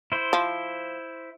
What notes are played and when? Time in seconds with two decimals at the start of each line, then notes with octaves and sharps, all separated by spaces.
0.12 E4 C5
0.33 F3